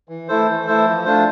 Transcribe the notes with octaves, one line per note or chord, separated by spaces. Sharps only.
E3
A3 E4 A4 C5
E3
A3 E4 A4 C5
F3
A3 D4 F4 C5